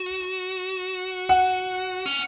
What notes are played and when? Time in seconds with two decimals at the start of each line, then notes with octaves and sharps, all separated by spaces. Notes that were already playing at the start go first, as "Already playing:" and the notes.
Already playing: F#4
1.29 F#5
2.06 C#4